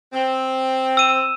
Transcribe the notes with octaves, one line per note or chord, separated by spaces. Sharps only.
C4
E6 D#7 E7